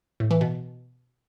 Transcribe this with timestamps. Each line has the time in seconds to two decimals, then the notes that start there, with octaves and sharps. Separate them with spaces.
0.20 A2
0.31 E3
0.41 B2